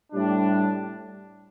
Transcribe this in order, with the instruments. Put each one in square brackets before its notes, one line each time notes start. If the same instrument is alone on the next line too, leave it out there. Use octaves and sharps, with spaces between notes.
[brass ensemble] A2 G3 D4